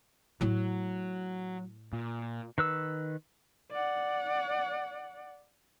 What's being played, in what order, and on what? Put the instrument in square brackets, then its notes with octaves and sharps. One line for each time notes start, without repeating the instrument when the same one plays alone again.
[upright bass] A2 E4 [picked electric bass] F#3
[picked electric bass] A#2
[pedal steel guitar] D#3 B4 E6
[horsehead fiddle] D5 F#5